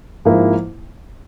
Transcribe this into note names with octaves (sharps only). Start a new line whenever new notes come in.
G#2 F3 A#3 E4